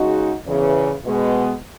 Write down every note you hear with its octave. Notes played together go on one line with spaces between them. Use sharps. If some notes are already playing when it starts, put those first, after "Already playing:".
Already playing: C#3 G#3 D#4 F#4
E2 C#3 E3
B2 G#3 B3